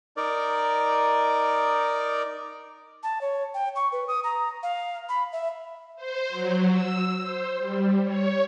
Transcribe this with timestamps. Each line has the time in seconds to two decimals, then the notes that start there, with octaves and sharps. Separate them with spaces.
0.17 D#4 A#4 D5
3.03 A5
3.21 C#5
3.54 G5
3.76 C#6
3.92 B4
4.08 D#6
4.24 A#5
4.63 F5
5.09 B5
5.33 E5
5.96 C5
6.29 F#3
6.70 E6
7.22 C5
7.59 G3
8.03 C#5